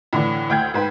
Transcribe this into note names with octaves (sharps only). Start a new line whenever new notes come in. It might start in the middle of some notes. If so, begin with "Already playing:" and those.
A2 D3 E3
D2 G5 G6 G#6
G#2 B4 G5